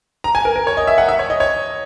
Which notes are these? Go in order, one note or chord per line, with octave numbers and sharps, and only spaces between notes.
A#5
G#5
A#4
A#4
C#5
D#5
E5
F#5
E5
C#5
D#5
C#5